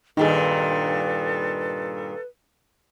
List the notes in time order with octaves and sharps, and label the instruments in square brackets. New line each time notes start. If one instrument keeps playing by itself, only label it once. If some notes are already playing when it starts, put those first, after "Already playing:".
[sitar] G2 A#2 D#3 [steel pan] D#4 G#4 [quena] A4 [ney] B4